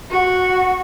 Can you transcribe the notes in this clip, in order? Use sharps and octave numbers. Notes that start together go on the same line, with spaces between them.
F#4